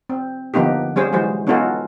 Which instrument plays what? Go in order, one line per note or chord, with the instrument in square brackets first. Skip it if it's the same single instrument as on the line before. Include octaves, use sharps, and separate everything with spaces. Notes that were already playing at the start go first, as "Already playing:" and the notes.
[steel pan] C4
D3 F3 A#3 B3 D#4 G4
G3 C#4 G#4 C5
E3 F#3 G#3 C5
B3 C#4 D#4 F4 F#4 A4